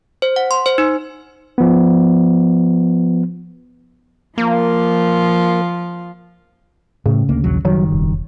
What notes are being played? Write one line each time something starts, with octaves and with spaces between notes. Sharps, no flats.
C5
F#5
C6
C5
D#4
F3 B3
F3 A#3 F4
A2 C#3
D2 A#3
A#1 D#2 F#3
F#1 D#3 F#3 G3
E1